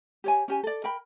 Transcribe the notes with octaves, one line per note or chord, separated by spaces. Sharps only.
G4 C#5 G#5
C#4 G4 G#5
A4 D5
A#4 G5 B5